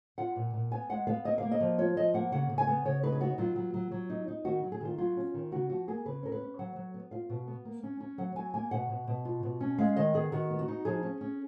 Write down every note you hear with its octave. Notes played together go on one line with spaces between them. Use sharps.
F4 F#5
A#2
A#2
B3 G#5
G#3 F#5
B3 F5
A#3 D#5
A#3 F5
D#5
F3
F4 C#5
F3 D#5
A#3 F#5
C#3 F#5
C#3
G#5
B3
C#3 C#5
D#4 B4
G#4
B3 F#4
F#3 F4
F#3
F#3
F#3
D#4
D#4
D#3 F#4
F#3
G#4
D#3 F4
F#3 F4
C#4
D#3
C#3 F#4
F3 F#4
A#3 G#4
C#3 B4
C#4 A#4
B4
C#4
F#3 F#5
F#3
B3
F4 F5
B2
B3
A#3
C#4
C#4
F#3 F#5
F#3 G#5
A#3 G#5
B2 F#5
B2
B2
F4
B2
C#4
G#3 F5
D#3 D#5
B3 G#4
D#3 F#4
B3
F#4
D#4
F3 G#4
C#4
C#4